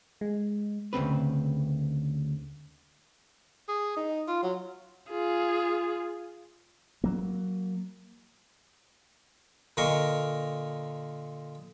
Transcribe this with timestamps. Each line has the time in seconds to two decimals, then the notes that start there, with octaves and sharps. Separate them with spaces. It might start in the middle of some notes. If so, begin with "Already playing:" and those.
0.21 G#3
0.93 D2 C#3 C4 B4
3.68 G#4
3.96 D#4
4.27 F4
4.43 F#3
5.10 F4 G#4
7.04 F#3 A#3
9.77 A#2 D3 A#4 D#5 C#6